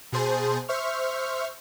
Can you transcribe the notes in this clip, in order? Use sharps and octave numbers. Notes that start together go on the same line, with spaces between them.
B2 G#4 C5 A5
C5 E5 C#6 F6